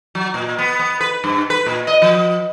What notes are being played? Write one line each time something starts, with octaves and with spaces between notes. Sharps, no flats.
F#3
A#2
B3
B3
B4
G2
B4
A#2
D#5
F3